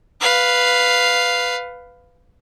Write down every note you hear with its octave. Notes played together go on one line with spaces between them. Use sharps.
B4 F5